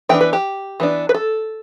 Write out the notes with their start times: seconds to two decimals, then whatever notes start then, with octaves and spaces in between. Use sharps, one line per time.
0.09 E3 B3 D4 G5
0.21 B4
0.33 G4
0.80 E3 B3 D4
1.09 B4
1.14 A4